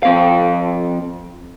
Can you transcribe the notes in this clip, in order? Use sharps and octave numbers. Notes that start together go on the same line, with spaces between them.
F3 C4 F5